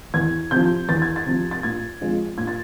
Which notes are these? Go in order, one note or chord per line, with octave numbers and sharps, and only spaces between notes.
E2 G#6
C3 F3 G6
E2 A6
G#6
A6
C3 F3
A6
A#2 G#6
F3 G#3 C4 F4
A#2 G#6
A6